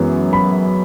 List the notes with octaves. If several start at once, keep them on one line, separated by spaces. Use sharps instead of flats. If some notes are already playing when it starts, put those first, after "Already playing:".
Already playing: F#2 E3 G#3 B3
B5